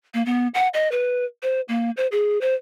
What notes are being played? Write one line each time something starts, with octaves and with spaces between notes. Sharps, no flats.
A#3
B3
F#5
D#5
B4
C5
A#3
C5
G#4
C5